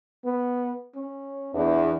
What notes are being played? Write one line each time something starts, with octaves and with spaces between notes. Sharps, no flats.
B3
C#4
E2 D4